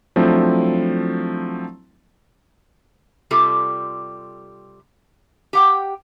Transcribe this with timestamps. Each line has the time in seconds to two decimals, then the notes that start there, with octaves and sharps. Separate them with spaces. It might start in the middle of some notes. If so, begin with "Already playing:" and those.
0.16 F3 F#3 A3 C4 D4 E4
3.31 C3 G3 F4 G4 A4
5.53 G4 F#5 G5